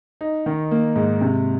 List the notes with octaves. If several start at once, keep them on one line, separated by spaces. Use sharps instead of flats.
D#4
D#3
A#3
G#2
C3